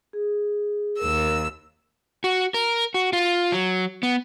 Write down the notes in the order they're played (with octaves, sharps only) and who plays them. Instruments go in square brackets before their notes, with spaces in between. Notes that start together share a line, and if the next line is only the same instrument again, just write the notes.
[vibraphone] G#4
[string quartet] D#2 E6 [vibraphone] A#4
[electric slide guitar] F#4
A#4
F#4
F4
F#3
B3